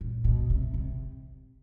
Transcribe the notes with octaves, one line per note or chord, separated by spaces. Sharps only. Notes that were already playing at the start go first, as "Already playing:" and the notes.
A#2
B2
C3
C3